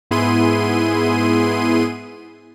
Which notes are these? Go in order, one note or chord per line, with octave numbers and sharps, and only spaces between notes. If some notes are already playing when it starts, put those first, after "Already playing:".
G#2 B3 E4 G#4 C6 D#7